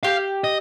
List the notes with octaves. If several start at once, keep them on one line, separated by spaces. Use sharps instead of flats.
G4 F5
D#5